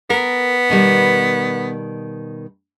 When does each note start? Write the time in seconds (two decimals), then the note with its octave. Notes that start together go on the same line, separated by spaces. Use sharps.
0.10 B3 A#4
0.70 B2 D#3 G3